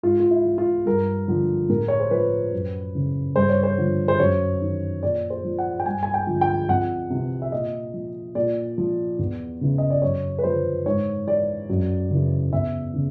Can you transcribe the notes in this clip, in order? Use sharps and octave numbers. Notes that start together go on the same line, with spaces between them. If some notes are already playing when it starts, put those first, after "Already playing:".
G#2 F4
F4
E4
E3
F4
G2 A#4
D3 F3
A2 A#4
C#5
C5
F3 B4
F#2
C#3 E3
G2 C5
C#5
C5
D3 F3
C5
F#2 C#5
D#3
A#2 D5
C5
F3
F#5
G5
G2 G#5
G#5
G5
D3 F3
G5
F2 F#5
C3 E3
E5
A#2 D#5
F3
A#2 D5
F3
E2
C#3 E3
D#5
D5
F#2 C#5
B4
D3 F3 C5
G#2 C#5
E3 D5
F#2
C#3 E3
E2 E5
C#3 E3